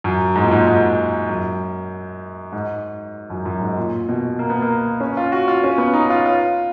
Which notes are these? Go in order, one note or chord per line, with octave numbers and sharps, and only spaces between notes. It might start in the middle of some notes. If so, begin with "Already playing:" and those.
F#2
G#2
A#2
G#2
G#2
F#2
G#2
F#2
F#2
G#2
A#2
B2
A#3
B3
A#3
C#4
F4
F#4
F4
C#4
B3
D#4
F4
F4